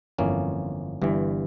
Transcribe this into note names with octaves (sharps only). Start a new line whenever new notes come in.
G1 F2 E3 A#3 C#4
G1 G2 E3